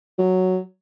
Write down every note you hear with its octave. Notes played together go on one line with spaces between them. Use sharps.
F#3